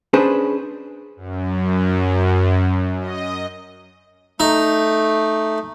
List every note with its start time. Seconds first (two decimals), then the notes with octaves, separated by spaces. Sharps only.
0.13 C#4 D4 G#4 B4 C5 A5
1.16 F#2
3.00 D#5
4.40 A3 D#4